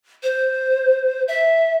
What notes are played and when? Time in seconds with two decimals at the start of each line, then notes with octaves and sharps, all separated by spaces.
0.23 C5
1.28 E5